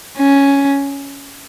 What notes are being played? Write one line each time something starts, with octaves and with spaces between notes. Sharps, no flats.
C#4